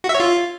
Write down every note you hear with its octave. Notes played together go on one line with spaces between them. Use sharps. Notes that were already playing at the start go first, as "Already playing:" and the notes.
F#4
E5
C#5
F4